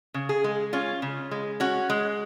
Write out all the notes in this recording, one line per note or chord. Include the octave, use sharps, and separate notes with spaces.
C#3
G#4
G#3
C#4 F4
C#3
G#3
C#4 F#4
G#3